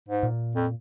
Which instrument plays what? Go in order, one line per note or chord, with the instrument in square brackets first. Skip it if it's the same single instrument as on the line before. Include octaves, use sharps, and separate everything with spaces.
[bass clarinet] G#2
[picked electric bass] A#2
[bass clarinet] F2